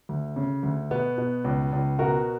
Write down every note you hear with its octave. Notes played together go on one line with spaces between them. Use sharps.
D2
C#3
D2
B2 B3
B2
C#2
C#2
B2 F#4 A#4